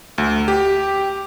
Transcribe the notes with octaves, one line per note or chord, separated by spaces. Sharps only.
D2
G4